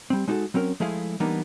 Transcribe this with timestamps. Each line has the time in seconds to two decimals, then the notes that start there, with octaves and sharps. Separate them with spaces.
0.10 G3 C4
0.28 G#3 D#4 F#4 G4 A4
0.54 F#3 C4 C#4 A#4
0.80 F3 G#3 A3 E4 G#4 F5
1.20 E3 G3 A#3 B3 D4 D#4